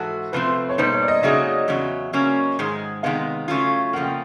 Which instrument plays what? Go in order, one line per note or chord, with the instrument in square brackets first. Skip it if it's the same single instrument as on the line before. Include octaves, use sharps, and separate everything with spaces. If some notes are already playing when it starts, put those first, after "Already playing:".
Already playing: [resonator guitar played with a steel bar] G#2 E3 F#4 [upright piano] A4
[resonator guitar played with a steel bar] C3 F3 A3 C4 [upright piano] B4
[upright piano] C#5
[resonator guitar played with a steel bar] B2 G3 A#3 D#4 [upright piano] C5
[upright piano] C#5
D5
D#5
[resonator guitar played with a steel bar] C#3 F#3 A#3 D#4 G#4 [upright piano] E5
[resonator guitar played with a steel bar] E2 C#3 F#3
C#3 F#3 A#3 C#4
G#2 D#3 G#3
[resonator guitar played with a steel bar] C3 D#3 G#3 B3 [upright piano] F5
[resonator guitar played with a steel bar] C#3 F#3 A3 C#4 F4
[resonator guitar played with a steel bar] C#3 F3 A#3 [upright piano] F#5
[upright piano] G5